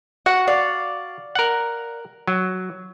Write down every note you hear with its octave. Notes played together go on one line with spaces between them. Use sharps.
F#4 F#5
D5 F5
A#4 F#5
F#3